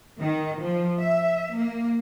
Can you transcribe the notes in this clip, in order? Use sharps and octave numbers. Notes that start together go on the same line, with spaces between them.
D#3
F3
E5
A#3